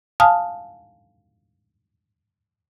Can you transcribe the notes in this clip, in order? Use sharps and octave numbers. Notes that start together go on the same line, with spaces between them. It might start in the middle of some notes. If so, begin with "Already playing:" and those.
F5 G#5 A5 D#6 F6